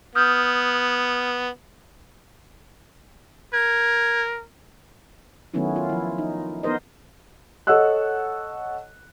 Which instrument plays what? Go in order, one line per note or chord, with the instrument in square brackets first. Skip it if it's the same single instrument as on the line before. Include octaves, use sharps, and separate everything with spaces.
[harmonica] B3 [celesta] D#6 F6 G6
[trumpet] A#4 [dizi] G#6
[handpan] D#3 F#3 A3 B3 C#4 E4
F4
F3 E4
D#4
B3 D#4 A#4 C5 D#5
[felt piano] A4 C#5 D#5 F#5 E6 F#6